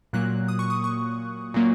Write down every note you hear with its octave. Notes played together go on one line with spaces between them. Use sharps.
A#2 F#3 A#3 F#6
D#6
C#6
D#6
C#6
A#2 F#3 A#3